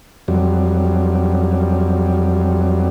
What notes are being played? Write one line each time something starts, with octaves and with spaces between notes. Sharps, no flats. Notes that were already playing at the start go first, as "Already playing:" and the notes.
F2 F#3 G3